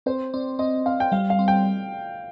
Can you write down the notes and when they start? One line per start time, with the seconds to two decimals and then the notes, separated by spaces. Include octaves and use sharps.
0.06 C4 C5
0.34 C4 D5
0.59 C4 D#5
0.86 C4 F5
1.00 G5
1.12 G3 F5
1.30 F5
1.39 C4
1.48 G5